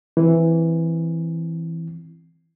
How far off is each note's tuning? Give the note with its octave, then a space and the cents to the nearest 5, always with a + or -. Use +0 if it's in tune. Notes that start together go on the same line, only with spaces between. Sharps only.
E3 +0 C4 +0